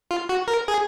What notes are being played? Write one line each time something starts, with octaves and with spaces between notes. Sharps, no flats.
F4
F#4
A#4
G#4